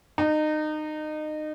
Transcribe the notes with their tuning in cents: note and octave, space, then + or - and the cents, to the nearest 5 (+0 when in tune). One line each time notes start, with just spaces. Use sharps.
D#4 -25